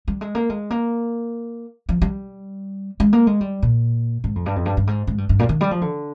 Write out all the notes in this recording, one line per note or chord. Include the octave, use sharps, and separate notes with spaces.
G3
G#3
A#3
G#3
A#3
F3
G3
G#3
A#3
G#3
G3
A#2
G#2
F2
G2
F2
G2
G2
G#2
G#2
G2
G2
A#2
D#3
G3
F3
D3